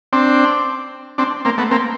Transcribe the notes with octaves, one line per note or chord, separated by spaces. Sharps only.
C4 D4
C4 D4
A#3 C4
A3 B3
A#3 C4